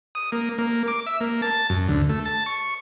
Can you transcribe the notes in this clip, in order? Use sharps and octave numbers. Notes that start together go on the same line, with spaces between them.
D#6
A#3
A#3
D6
E5
A#3
A5
F#2
D2
A3
A5
C#6